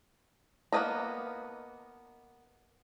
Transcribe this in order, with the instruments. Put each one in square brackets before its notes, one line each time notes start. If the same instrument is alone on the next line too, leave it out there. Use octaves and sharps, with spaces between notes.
[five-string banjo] A#3 B3 B4 D#5 A#5